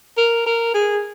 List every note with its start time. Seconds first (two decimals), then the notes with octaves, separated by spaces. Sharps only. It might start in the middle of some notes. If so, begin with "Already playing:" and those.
0.17 A#4
0.46 A#4
0.74 G#4